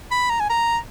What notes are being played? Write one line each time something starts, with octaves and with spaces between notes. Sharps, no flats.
B5
A#5
G#5
A#5